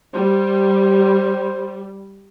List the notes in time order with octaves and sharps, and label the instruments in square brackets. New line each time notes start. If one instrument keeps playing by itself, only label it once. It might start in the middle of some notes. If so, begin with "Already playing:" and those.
[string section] G3 [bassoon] C5